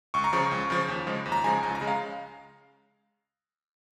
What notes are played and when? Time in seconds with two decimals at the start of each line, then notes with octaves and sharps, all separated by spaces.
0.14 C#2 C#6
0.24 A#5
0.33 C#3 F3 C#6
0.51 C#2
0.70 C#3 F3
0.88 D#2
1.07 C#3 F3 G#3
1.26 D#2
1.32 A#5
1.44 C#3 F3 G#3 G#5
1.63 C#2 A#5
1.75 A#5
1.81 C#3 G#3
1.87 F5